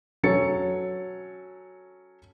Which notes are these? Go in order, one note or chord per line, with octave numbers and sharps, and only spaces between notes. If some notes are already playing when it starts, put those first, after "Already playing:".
F#3 C#4 A4 C#5 A6 C#7